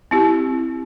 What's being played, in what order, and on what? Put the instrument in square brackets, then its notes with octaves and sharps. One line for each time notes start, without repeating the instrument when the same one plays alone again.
[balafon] C4 E4 G4